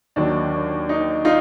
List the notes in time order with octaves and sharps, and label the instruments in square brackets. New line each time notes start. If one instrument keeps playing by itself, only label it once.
[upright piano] D#2 D#3 F#3 D4
D#4
D#4 F4